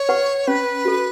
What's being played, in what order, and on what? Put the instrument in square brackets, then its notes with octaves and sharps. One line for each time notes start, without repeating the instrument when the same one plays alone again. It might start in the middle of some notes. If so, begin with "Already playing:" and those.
Already playing: [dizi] C#5
[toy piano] B4 F#5 C#6
[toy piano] C#4 [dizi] B4
[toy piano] F#4 A4